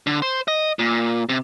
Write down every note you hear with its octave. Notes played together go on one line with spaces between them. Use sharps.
D3
C5
D#5
A#2
C3